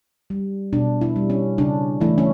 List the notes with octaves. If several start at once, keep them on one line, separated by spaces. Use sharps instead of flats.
G3
B2 D4
E4
G3
C#4
C#3 D4
E3 A3 E4
C#4